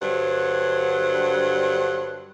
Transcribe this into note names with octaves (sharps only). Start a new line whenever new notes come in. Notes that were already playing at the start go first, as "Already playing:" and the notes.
G2 D3 F#3 C5 F#5